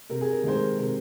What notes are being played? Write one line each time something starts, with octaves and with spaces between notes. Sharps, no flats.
C3 A#4
G#4
A#4
D#3 G#3 C5
A#4
C3 A#4